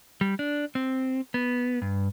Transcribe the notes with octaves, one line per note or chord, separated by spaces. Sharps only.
G3
D4
C4
B3
G2